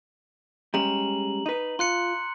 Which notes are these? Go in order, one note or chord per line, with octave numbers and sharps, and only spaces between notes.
G3 G#3 C#4 A#5 F#7
D#4 B4
F4 C6 F#6 C#7